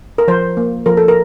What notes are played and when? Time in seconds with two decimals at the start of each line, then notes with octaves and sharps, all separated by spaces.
0.18 A#4
0.28 F3 C5
0.57 A#3
0.86 F3 A#4
0.97 A4
1.08 A#4